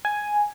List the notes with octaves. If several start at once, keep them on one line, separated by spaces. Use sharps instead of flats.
G#5